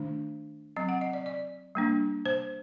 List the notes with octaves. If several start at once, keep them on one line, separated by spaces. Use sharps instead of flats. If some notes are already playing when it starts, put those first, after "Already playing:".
Already playing: D#3 A3 D4
F#3 C4 D#5
F#5
D#5
D5
D5
G3 A#3 D4
C5